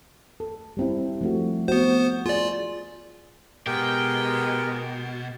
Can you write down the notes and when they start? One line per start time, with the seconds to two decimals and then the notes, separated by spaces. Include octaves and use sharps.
0.40 A4
0.77 G3 C4 E4
1.21 F3 A3 F#4
1.68 B3 F#4 C5
2.26 F4 G#4 D5
3.67 B2 G#3 B3 G4 A#4 G5